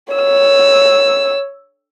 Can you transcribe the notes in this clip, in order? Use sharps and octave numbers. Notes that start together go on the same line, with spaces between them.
C#5 E6